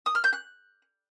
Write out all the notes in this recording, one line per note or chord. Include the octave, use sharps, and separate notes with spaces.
D#6
F6
G6
F#6